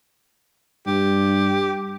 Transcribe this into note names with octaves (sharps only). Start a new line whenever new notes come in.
G2 G4